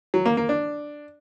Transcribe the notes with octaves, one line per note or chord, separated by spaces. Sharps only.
F#3
A#3
A#3
D4